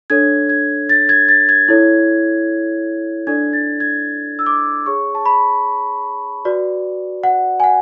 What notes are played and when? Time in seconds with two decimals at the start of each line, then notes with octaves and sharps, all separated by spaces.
0.10 D4 A4 C#5 G#6
0.49 G#6
0.89 A6
1.09 G#6
1.29 A6
1.49 G#6
1.68 E4 A4 C#5
3.27 D4 A4 D5 G#6
3.53 A6
3.80 G#6
4.39 E6
4.46 D6
4.86 G#4 C#5 C#6
5.15 A5
5.25 B5
6.45 F#4 B4 D5
7.24 F#5
7.60 G#5
7.64 F#5